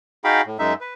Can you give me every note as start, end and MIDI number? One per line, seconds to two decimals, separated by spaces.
0.24 0.41 63
0.24 0.41 66
0.24 0.41 68
0.24 0.41 77
0.24 0.41 79
0.24 0.41 83
0.46 0.57 45
0.59 0.73 42
0.59 0.73 56
0.59 0.73 63
0.59 0.73 76
0.81 0.94 71